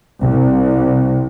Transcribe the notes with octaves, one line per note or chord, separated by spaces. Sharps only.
C2